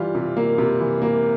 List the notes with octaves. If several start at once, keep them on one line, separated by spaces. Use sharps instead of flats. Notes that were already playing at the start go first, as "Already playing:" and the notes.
Already playing: E3 G3 F4
C3
A#3
C3
E3
A#3